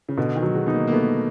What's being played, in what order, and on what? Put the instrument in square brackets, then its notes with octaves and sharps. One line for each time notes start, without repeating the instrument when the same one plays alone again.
[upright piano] C#3
[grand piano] B2 [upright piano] D3
[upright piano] D#3
[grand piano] F#3
[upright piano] G#3
[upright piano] B3 [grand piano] D#4
[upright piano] A#3
A#3
[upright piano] A3 [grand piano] B3